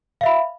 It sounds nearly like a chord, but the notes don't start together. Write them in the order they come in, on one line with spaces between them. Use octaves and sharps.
F5 E5 B5